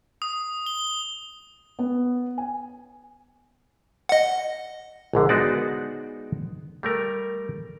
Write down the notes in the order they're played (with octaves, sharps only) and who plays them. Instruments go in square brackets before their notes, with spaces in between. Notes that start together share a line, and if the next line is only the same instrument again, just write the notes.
[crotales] D#6
G7
[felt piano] B3
G#5
[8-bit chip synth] D#5 F#5
[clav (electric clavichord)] A#1 G#2 D3
G#3 B3 D#4 F#4 C5 D5
G3 A3 A#4